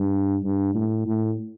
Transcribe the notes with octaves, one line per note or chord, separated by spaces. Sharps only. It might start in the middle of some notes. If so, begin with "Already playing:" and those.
Already playing: G2
G2
A2
A2